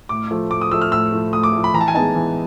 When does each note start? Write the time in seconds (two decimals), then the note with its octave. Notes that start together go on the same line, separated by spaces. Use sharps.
0.09 A2 D6
0.31 F3 A3
0.51 A2 D6
0.61 D#6
0.71 F3 A3 E6
0.82 F6
0.92 A2 E6
1.12 F3 A3
1.33 A2 D#6
1.44 D6
1.53 F3 A3
1.64 B5
1.74 E3 A#5
1.81 A5
1.88 G#5
1.94 G#3 B3 D#4 A5
2.15 E3